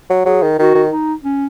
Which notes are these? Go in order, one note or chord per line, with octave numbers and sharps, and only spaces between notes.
F#3
F#3 G#4
D#3
D#3 F#4
D#3
D#4
C#4